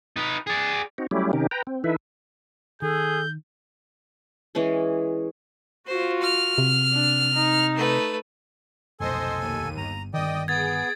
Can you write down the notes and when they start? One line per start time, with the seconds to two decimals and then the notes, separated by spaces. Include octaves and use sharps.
0.16 D#4 B4
0.47 G#4 D5
0.98 C4 D#4 F#4
1.11 F#3 G3 A3 C#4 E4 G4
1.33 C3 D#3 C#4 D#4 G4
1.51 B4 G5 A#5
1.67 C4
1.84 E3 D#4 E4 A4 B4 E5
2.82 D#3 G#4 A4 G6
4.55 E3 G#3 C#4 G#4
5.88 F4 F#4 C5
6.22 F6
6.58 C3
6.92 D4
7.34 D#4
7.75 A3 B4
9.00 F1 B1 A4 C5 D#5 G#5 C6
9.40 D#2 D#7
9.77 G1 A#5
10.14 G1 D#3 D5 D#5 G5 D#6
10.48 B3 G#4 G#6 A6 D7